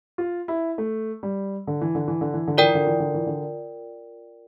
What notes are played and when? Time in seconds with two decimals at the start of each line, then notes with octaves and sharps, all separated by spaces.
0.18 F4
0.48 E4
0.78 A3
1.23 G3
1.67 D3
1.81 E3
1.95 D3
2.08 E3
2.21 D3
2.34 E3
2.48 D3
2.58 E3 F4 A#4 D5 G5
2.75 D3
2.87 E3
3.00 D3
3.14 E3
3.27 D3